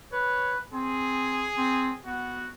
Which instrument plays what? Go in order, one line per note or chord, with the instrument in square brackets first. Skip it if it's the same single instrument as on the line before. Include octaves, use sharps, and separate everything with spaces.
[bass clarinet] B4 [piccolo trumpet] C#5
[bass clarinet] C4 [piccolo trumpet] G#4
[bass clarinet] C4
[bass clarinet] B3 [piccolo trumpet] F#4